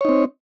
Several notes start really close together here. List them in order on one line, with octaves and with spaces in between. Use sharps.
C#5 D#4 C4